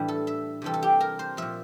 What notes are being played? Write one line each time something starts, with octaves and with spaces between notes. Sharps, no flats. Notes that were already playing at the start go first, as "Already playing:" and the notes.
Already playing: A2 E3 G3 D4 E4
A4
E5
C3 E3 G3 A4
A4
G4
A#4
C5
A#2 F3 E5